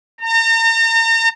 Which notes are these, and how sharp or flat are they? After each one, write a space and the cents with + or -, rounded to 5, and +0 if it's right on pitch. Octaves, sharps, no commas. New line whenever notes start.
A#5 -40